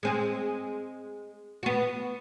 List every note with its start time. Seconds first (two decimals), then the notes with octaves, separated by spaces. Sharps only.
0.03 G#3 C4 G#4
1.63 B3 F#4